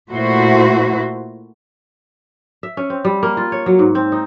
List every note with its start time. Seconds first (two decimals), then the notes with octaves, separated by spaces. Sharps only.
0.10 A#2 A3 E4 F#4 C5
2.63 E5
2.77 C#4
2.90 C4
3.05 G3
3.23 A#3
3.37 F4
3.52 C#5
3.66 F#3
3.79 G#2
3.95 C4
4.12 D#4